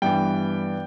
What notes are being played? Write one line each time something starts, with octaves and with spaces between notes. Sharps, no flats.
G2 E3 B3 G5